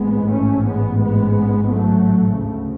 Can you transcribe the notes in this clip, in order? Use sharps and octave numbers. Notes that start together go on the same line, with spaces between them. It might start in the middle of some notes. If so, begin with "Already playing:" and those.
Already playing: A1 G#2 G#3 B3
A3 C#4
G#3 B3
G#3 B3
F#3 A3
D2 C#3